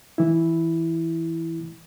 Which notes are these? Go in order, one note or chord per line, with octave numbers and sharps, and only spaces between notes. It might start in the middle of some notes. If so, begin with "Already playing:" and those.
E3 E4